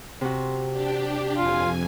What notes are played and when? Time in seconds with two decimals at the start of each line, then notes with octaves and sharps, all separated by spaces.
0.21 C3 F#4
0.71 D4 G4
1.37 F2 F4 G#5